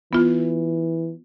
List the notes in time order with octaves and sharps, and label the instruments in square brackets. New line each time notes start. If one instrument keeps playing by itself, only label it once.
[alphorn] E3 [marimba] B3 F4